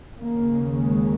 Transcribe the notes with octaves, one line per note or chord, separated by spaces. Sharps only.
D#2 C#3 A#3
G#3